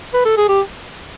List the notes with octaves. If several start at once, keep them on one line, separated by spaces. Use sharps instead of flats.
B4
A4
G#4
G4